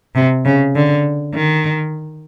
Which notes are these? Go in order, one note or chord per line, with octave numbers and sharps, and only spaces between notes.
C3
C#3
D3
D#3